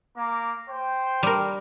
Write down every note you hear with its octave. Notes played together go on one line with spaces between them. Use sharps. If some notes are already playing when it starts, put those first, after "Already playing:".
A#3 A#5 D6
C5 G5
G3 A#4